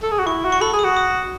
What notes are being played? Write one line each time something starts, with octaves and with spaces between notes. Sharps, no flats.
A4
G#4
F#4
E4 C#6
F#4
C#6
A4 B5
G#4
D#6
F#4
D#6